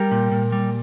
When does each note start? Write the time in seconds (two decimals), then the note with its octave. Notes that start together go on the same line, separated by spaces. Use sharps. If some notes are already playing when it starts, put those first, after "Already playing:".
Already playing: G3 G4 A#4
0.11 A#2
0.32 A#2
0.52 G3